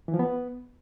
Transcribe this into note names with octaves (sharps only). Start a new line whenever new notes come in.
E3
F3
B3